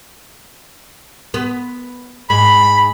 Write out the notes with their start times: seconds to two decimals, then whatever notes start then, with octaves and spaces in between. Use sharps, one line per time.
1.34 B3
2.30 G#2 B5